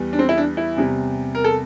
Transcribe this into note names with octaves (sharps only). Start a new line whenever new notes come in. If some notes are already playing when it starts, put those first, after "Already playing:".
Already playing: E2 E3 G3
D4
C4
E4
D4
E4
E2 C3 G3
A#4
A4